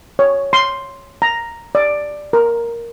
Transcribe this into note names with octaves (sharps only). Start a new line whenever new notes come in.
C#5
C6
A#5
D5
A#4